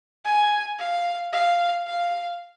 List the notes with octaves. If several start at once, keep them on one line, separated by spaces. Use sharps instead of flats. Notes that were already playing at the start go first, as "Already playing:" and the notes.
G#5
F5
F5
F5